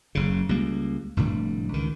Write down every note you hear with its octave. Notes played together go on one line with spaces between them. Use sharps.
F#1 C#3
C#2 G3 A#3
F1 A2 D3 G3
C#2 D#3